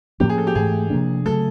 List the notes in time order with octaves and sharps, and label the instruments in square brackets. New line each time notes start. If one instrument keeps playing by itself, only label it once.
[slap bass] A2 F3 A#3 C#4 [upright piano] G4
[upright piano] G#4
A4
G4
[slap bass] G#2 E3 A3 [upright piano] G#4
[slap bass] C3 F3 A#3 D4
[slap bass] C#3 F#3 A3 [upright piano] A4